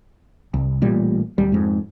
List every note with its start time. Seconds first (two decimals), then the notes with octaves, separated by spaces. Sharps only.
0.54 C2
0.82 A1 A#2 G3
1.38 D1 G3
1.52 F2 G#2